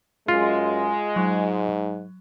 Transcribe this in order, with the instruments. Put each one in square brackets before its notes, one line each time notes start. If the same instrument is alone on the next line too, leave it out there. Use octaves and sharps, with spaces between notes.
[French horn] F#2 [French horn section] G#3 [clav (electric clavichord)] F4
[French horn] G#2 [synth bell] F#3